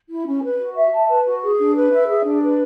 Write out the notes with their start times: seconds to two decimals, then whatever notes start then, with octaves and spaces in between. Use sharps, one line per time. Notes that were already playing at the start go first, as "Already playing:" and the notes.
0.08 E4
0.25 C#4
0.42 B4
0.59 F#4
0.75 E5
0.91 A5
1.08 B4
1.25 F#4
1.42 G#4
1.58 D4
1.74 B4
1.91 E5
2.08 G#4
2.24 D4
2.41 B4